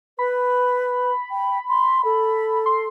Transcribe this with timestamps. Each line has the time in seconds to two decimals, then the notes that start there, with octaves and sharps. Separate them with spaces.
0.19 B4 B5
1.31 G5
1.69 C6
2.05 A4
2.66 C6